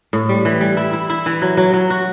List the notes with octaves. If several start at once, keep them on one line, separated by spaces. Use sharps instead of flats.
A2
G3
E3
G3
E4
E4
E4
E3
F#3
F#3
F#3
F#4